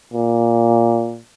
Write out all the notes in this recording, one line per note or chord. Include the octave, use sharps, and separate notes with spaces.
A#2